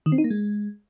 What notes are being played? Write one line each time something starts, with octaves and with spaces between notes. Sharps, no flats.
D#3
C4
D#4
A#3
G#3